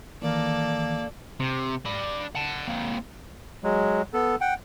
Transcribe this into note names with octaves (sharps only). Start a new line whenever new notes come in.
D#3 E3 A#3 A4 D5
C3
D4 B5
F#5 A5
A#3 C4
F#3 G#3
B3 A4
F#5 G5